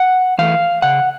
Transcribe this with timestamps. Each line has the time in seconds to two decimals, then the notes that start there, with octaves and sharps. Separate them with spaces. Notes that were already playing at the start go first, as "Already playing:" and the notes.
Already playing: F#5
0.38 E3 A3 F5
0.82 C#3 F#5